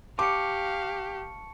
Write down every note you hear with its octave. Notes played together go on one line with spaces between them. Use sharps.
G4 F5 A5 C#6 D6 C#7